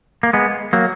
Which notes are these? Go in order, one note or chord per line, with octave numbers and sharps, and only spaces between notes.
A#3
G#3 B3
F#3 A#3